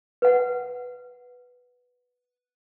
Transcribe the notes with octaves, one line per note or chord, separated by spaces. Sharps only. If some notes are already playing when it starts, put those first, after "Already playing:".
B4 F#5